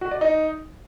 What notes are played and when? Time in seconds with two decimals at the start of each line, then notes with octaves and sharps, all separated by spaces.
0.01 F#4
0.11 D5
0.21 D#4